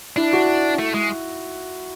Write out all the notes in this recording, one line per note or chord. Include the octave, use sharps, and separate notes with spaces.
D4 E4
F#4
A3
G#3